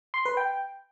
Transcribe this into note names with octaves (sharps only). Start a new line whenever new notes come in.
C6
B4
G5